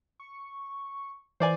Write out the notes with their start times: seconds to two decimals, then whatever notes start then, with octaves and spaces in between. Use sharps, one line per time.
0.20 C#6
1.40 E3 C5 D5 G#5